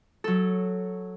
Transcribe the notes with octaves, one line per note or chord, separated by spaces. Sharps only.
F#3 A4